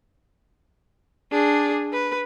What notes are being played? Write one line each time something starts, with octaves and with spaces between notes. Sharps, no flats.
D4 G#4
B4